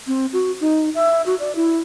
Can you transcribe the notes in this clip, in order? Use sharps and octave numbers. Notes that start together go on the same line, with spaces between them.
C4
F#4
D#4
E5
F#4
D5
E4